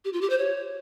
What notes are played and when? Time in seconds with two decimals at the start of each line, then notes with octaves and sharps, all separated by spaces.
0.05 G4
0.13 F4
0.21 G4
0.30 C5
0.38 C#5